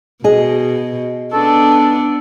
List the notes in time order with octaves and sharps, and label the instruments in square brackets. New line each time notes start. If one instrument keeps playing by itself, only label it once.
[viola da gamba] B2 [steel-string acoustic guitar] G#4 D#5
[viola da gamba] B3 D4 [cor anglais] A4